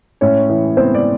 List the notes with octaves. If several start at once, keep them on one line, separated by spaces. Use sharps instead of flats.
A2 C#4 C#5
E3
B3 C4 C5
D5